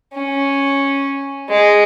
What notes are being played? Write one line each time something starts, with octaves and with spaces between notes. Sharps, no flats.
C#4
G#3